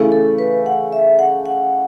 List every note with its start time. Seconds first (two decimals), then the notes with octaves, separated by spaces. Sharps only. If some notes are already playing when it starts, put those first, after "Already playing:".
Already playing: C#3 E3 A3
0.12 A4
0.38 B4
0.66 F#5
0.92 E5
1.19 F#5
1.46 F#5